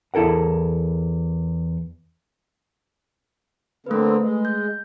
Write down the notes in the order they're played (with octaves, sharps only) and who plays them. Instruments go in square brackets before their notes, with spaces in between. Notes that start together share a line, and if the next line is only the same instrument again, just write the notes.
[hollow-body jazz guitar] E2 E4 A4 A#4 F#5
[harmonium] D3 A#3 C4 [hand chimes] A3 B4
[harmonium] G#3
[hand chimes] G6